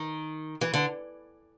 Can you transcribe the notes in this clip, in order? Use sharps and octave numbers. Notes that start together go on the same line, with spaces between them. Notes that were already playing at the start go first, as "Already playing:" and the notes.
Already playing: D#3
E3
D3